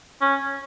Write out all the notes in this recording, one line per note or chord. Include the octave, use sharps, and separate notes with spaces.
C#4